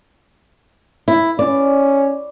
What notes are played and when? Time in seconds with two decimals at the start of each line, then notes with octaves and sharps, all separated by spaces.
1.08 E4
1.39 C#4 D5